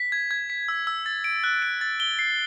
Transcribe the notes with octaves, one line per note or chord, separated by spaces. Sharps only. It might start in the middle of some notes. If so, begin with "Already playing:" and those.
Already playing: B6
G#6
G#6
B6
E6
E6
A6
D7
F#6
D7
A6
G7
C7